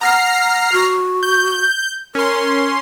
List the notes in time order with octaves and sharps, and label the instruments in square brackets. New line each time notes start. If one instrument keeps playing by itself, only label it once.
[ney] F#5 [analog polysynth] A#5 F6 C7
[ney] F#4
[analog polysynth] G6
[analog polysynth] C#4 C6 [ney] A#4